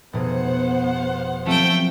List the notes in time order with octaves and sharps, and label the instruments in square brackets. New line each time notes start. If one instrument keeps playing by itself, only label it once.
[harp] F1 B2 G#4 [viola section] B3 C5 F#5
[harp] F3 F#3 [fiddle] A3 G5 [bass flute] C4